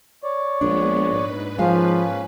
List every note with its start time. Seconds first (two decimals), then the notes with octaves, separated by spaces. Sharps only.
0.23 C#5 D5
0.61 A#1 A#2 G#3 B3 D4
1.08 G#2 B4
1.59 F3 G#3 A#3 C#4 F5